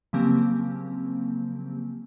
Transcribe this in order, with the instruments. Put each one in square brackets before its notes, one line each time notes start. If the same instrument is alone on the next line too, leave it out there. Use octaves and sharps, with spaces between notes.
[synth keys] C#3 F3 F#3 A#3 C4 G4